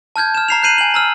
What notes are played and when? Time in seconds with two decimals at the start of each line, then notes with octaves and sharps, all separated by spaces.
0.16 A5 F6 G6 G#6
0.35 F6 E7
0.48 A#5 C7 F7
0.63 F#6 G6 C7 D#7 F#7
0.78 G#5 F#7
0.94 A#5 E6 F6